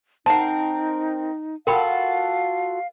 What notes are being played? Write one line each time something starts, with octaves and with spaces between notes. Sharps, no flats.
C4 D#4 A#4 F#5 A5
F4 F#4 A4 A#4 F5 G5 B5